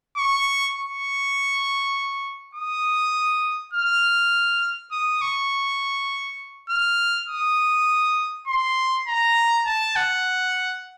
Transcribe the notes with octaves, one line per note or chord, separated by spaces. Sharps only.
C#6
C#6
D#6
F6
D#6
C#6
F6
D#6
C6
A#5
A5
F#5